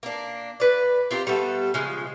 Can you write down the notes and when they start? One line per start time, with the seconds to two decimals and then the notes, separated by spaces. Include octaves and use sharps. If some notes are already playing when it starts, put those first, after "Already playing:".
0.03 A#3 D4
0.60 B4 D5
1.11 C4 F4 G4 A#4
1.27 G3 A3 B3 A4
1.74 C#3 F3 G#3